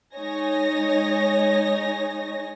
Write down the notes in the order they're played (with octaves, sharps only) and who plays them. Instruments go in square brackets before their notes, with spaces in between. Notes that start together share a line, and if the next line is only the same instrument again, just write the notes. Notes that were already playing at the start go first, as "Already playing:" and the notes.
[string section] G#3 D#4 C#5 G#5 A#6